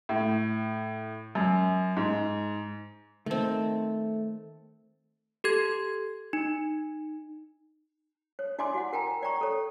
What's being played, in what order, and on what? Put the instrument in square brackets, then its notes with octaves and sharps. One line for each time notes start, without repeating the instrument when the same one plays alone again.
[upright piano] A2
F#2
G#2
[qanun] D#3 C4 [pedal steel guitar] A3 A5
[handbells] G4 A4 G#6
D#4
[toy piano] C#5
E4 D5 D#5 G#5 C6 D6
F#4 F5 F#5
A#4 G5 G#5 A#5
C#5 D5 G5 A#5 C#6
A4 C#5